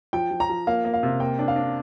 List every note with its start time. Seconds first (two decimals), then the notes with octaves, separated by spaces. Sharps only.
0.13 F3 G5
0.31 F3
0.40 A#5
0.49 F3
0.67 A#3 F5
0.85 A#3
0.93 F5
1.03 C3
1.20 A#3 G5
1.39 D4
1.48 F5
1.56 D4